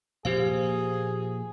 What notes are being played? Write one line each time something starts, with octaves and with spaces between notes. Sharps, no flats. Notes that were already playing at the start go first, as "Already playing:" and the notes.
A#2 F3 A#3 G4 G#4 C5 F5